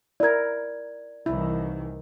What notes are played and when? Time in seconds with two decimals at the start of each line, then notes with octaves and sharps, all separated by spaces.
0.20 E4 A#4 D5 G#6
1.26 C2 D#3 E3 E4